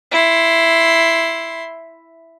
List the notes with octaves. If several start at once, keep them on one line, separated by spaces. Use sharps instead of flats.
E4 C6